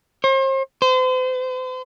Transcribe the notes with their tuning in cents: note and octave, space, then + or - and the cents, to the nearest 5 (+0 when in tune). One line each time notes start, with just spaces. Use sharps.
C5 +40
C5 -40